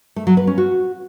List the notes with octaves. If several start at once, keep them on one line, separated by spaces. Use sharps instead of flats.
A3
F#3
B4
C#4
F#4